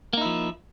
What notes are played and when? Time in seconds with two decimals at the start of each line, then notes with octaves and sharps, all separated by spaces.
0.13 A#3
0.17 D#4
0.21 E4
0.26 F3